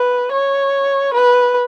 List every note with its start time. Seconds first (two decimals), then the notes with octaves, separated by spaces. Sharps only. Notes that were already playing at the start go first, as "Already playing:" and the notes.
Already playing: B4
0.32 C#5
1.14 B4